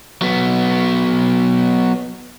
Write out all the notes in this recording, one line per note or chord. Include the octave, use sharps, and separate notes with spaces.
F#3 B3